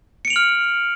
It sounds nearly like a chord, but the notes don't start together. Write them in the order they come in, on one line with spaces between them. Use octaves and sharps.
C#7 D7 F7 F#7 F6